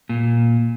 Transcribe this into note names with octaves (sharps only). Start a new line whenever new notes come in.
A#2